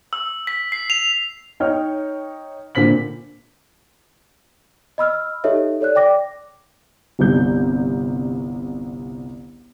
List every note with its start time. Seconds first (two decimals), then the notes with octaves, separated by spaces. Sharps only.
0.13 E6
0.47 B6
0.72 C7
0.90 F7
1.60 D#4 C#5 G5 F6
2.75 A#2 D3 C4 B6 F#7
4.98 D#5 B5 E6 F6
5.44 D#4 G4 A4 C#5 D#5 E5
5.81 A4 C#5 D5 F#6
5.95 D5 G5 D6 A#6
7.19 G1 C2 G3 G6